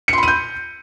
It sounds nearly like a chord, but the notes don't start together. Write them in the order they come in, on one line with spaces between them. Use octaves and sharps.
C#7 C6 B5 D#7 G6